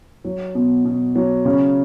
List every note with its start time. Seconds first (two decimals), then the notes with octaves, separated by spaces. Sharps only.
0.25 F#3
0.55 B2
0.85 B2
1.16 F#3
1.45 C#3